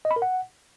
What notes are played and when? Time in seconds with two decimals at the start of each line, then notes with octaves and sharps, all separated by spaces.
0.05 D#5
0.11 B5
0.16 A#4
0.22 F#5